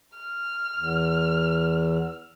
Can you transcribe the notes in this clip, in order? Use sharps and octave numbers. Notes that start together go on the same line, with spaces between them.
F6
E2